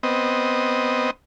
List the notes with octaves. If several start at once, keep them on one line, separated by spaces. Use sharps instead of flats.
B3 C4 D#5